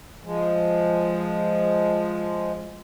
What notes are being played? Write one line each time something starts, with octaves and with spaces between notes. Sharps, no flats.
F3 G#3